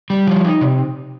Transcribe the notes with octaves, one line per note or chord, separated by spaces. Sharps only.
G3
F3
D#4
C3